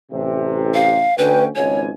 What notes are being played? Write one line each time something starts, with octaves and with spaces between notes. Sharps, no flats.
A1 C3
F5
D2 C#4 B4 G5
G#1 C#2 C#5 G#5